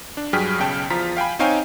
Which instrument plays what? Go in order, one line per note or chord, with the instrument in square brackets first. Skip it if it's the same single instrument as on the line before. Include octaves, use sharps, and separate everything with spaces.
[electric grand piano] D4
G2 F#3 G#4 G5 F6 B6
B1 C#3 G5 A5
E2 F3 F4 A#5 B6
F5 G5 G#5 B5
C4 D#4 C#5 F5 G5 G#5